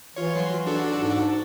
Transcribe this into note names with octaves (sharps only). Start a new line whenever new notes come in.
E3 F4 C#5
F#3 C6
D4 F#4 A4
G#2